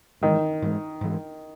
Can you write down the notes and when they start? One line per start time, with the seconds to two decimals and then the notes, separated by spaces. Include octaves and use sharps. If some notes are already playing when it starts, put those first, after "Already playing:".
0.21 G#2 D#3 E3 G#3
0.62 G#2 E3 G#3
1.01 G#2 E3 G#3